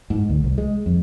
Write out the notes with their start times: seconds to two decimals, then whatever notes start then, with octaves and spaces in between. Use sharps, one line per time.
0.10 G#2
0.29 D2
0.44 C2
0.58 G#3
0.86 F2